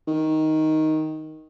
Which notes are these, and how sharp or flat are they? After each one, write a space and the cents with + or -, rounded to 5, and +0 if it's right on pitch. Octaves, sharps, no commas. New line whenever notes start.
D#3 +5